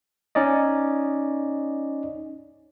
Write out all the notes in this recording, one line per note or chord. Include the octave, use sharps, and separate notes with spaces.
C#4 D#4 D5 D#5